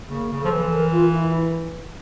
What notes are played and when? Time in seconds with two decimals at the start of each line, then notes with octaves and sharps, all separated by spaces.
0.09 C#3 A#3
0.30 C#3
0.40 F3 A4
0.51 E3
0.71 A#4
0.92 F4
1.13 E4